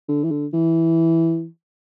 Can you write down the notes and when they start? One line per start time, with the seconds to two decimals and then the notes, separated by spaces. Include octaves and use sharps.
0.09 D3
0.24 E3
0.31 D3
0.53 E3